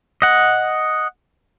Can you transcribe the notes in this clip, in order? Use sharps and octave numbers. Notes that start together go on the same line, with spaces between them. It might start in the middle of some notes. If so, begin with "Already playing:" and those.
D#5 F#5